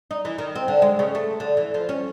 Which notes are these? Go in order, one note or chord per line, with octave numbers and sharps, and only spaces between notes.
D#4
E3
D#3
C4
D3
G#3
C#3
A3
D3
E3
F3
C#4